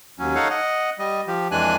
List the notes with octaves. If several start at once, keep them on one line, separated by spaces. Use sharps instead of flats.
D#2 F#3 C#4
D#4 A4 C#5 F5 F#5
D#5 F#5
G3 D#5
F3 G4
F2 E3 G#3 D4 G#5 F#6